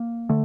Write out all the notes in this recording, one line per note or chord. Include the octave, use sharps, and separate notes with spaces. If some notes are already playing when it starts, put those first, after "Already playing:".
Already playing: A#3
D3 A3